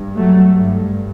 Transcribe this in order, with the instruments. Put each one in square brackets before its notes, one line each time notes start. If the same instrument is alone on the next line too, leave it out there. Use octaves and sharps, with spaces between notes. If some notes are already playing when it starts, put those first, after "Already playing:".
Already playing: [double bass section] G2
F#3 A3
G2